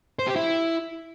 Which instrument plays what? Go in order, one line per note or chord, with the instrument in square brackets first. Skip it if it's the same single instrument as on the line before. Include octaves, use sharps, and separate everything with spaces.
[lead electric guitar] C5
G4
E4